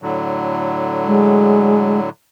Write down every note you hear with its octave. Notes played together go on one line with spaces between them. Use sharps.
A2 D3 F#3
G#3